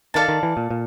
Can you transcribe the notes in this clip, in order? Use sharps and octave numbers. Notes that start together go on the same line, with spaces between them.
D#3 A4 D5 F5 A5
D#3
E3
A#2
A#2